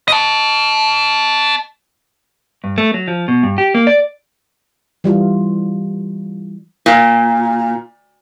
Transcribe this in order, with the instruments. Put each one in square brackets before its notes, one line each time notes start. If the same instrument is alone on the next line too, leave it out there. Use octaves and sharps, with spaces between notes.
[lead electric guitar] D#5 A5
[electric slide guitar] G2
A3
F#3
F3
B2
G2
G4
A#3
D5
[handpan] E3 G3 F4
[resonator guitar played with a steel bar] A#2